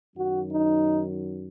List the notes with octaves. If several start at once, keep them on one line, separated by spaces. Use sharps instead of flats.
F#2 D#3 F#3 F#4
D#4